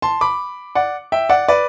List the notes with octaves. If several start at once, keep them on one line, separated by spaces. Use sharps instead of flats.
A5 C6
B5 D6
D5 F#5
E5 G5
D5 F#5
B4 D5